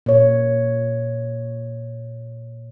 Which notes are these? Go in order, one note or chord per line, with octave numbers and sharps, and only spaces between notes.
A#2 C#5